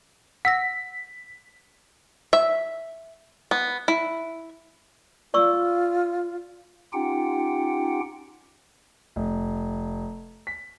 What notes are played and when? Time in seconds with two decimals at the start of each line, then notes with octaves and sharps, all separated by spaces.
0.45 F#5 E6 A#6 B6
2.33 E5
3.51 B3
3.88 E4
5.34 F4 D5 C#6 E6
6.93 C#4 D#4 F4 G4 F#5 G5
9.16 F1
10.47 B6